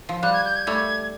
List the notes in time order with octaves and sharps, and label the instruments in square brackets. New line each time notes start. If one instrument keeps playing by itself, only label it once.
[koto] F3
[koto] G3 [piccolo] F#6
[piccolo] G#6
G6
G#6
[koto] G3 A3 [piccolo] G#6